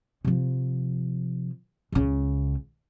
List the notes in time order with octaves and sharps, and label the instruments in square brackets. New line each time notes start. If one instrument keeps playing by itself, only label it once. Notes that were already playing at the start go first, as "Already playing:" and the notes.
[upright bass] C3 F3
C#2 C#3